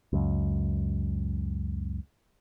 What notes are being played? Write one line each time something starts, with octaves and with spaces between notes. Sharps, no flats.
C#2 F#2